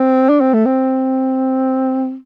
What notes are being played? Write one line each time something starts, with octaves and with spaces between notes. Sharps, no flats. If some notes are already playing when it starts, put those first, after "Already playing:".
Already playing: C4
D4
C4
A3
C4